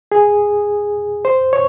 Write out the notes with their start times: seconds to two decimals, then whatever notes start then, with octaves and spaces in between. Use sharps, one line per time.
0.12 G#4
1.25 C5
1.53 C#5